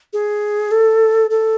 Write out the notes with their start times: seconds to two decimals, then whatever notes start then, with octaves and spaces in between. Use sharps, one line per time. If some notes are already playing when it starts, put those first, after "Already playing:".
0.13 G#4
0.71 A4
1.30 A4